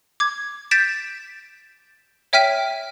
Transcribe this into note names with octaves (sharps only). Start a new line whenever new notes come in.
D6 G#6
G6 A6 B6 D7 E7
C#5 E5 G5 F6 B6 D#7